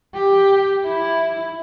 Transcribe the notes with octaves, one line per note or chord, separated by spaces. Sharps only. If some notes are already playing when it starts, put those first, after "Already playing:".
G4
E4